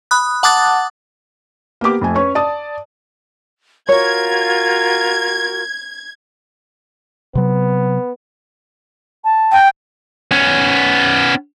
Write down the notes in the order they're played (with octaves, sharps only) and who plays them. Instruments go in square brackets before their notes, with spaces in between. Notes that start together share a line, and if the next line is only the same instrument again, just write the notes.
[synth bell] B5 D#6 F#6
F#5 A5 D6 D#6 F#6 A6
[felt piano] A#3 B3 G4 D6
F2 A3 G#5
C#4 B4 C#5 C#6
D5 A5 D#6
[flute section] F4 F#4 A#4 [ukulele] C#5 [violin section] G#6
[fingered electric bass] C3 F#3 [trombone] B3
[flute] A5
[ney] G5
[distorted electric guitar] B3 C#4